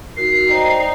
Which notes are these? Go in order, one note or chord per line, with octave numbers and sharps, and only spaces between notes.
D#4 F#4 A#4 C7
D#4 C5 D5 G5